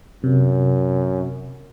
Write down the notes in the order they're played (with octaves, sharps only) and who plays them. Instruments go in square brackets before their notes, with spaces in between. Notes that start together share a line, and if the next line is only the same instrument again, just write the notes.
[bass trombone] F#2 [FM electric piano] C3